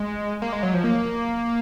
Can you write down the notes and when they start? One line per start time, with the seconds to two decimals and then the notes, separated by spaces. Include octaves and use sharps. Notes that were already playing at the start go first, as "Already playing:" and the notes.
Already playing: G#3
0.42 A#3
0.53 G#3
0.63 F#3
0.74 F3
0.84 A#3